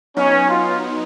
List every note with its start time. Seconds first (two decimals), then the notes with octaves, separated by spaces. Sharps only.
0.16 F#3 B3 C#4 D#4
0.49 F4